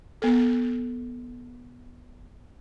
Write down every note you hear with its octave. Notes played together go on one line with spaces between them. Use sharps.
B3 A4